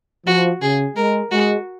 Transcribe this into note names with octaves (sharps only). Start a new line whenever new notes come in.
F3 F#4
C#3 G#4
G#3 A#4
G#3 F#4